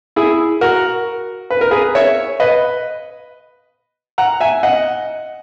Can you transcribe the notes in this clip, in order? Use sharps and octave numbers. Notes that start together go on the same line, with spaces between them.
E4 G#4
F#4 A#4
B4
A#4
G#4 B4
C#5 E5
B4 D#5
F#5 A#5
E5 G#5
D#5 F#5